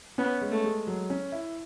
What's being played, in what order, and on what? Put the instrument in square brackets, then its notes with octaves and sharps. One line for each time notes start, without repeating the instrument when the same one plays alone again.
[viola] B3 [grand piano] C#4
[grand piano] G#3
[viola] A3
[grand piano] G#3
F#3
C#4
E4